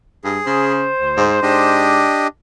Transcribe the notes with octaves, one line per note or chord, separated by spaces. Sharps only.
G2 G#4
C#3 C5
D2
G#2
G#2 D4 G4 D#5